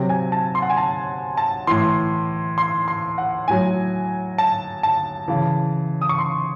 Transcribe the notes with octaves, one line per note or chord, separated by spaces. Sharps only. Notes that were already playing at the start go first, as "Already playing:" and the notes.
Already playing: C3 F#3
G#5
A5
C6
F#5
G#5
A5
A5
A2 E3 C6
C6
C6
F#5
A2 F#3 G#5
A5
A5
C#3 E3
D#6
C#6
C6